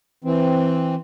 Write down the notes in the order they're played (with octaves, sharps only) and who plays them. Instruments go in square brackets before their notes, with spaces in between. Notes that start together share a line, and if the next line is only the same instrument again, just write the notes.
[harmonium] E3 C4